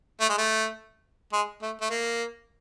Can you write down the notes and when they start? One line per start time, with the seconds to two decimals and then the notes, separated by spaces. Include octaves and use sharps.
0.21 A3
0.29 G#3
0.38 A3
1.33 G#3
1.62 A3
1.81 A3
1.90 A#3